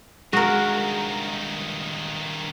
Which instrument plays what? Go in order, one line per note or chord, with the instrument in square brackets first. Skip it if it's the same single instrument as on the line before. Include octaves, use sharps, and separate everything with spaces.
[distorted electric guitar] G2 D#3 [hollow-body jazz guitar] G#3 [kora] F#4 A#4